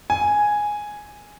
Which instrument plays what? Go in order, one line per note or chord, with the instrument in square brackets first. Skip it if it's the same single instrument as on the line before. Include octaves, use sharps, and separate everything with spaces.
[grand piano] G#5